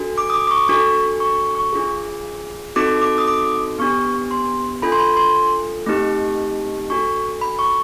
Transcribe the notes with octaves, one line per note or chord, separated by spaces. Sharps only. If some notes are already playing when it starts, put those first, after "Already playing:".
Already playing: D4 F#4 A4
D6
D#6
D6
D6
C#6
D4 F#4 A4 C#6
C#6
C#6
D4 F4 G#4
C4 D#4 F#4 A4 D6
D6
D#6
D6
B3 D4 G4 C#6
C6
D4 F4 A4 B5
C6
B5
C6
A3 C4 D#4 G4
D4 F#4 A4 C#6
B5
C#6